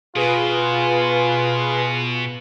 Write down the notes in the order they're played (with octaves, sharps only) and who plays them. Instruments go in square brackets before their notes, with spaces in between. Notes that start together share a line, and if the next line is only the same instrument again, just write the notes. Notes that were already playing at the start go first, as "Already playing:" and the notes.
[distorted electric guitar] B2 [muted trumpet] F4 [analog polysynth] G#4 B4